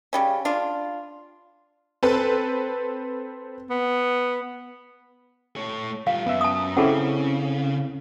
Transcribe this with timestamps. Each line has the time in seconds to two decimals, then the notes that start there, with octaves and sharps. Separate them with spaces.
0.13 C#3 G3 C#4
0.45 D4 F4
2.03 C4 A4 B4
3.70 B3
5.57 A3 C#5
6.07 G3 F4 F5
6.26 F#2 B3 E5
6.41 A5 D#6
6.77 C#3 C4 C#4 E4 G#4 A4 F#5